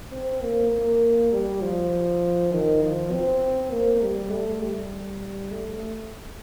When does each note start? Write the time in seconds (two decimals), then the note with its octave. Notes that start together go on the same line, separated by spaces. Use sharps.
0.12 C4
0.42 A#3
0.71 A#3
1.32 G3
1.61 F3
2.52 D#3
2.82 F3
3.12 C4
3.71 A#3
4.02 G3
4.31 A3
4.61 G3
5.51 A3